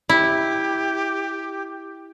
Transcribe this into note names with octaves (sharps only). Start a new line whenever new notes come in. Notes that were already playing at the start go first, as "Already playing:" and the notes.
E4 G4